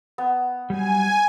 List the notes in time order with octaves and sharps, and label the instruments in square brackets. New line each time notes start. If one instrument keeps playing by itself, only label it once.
[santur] B3
[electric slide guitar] F#3 G3 [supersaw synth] G#5